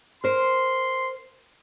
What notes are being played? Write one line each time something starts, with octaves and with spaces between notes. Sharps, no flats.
A#4 C5 C6